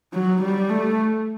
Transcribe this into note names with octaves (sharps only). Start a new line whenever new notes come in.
F#3
G3
A3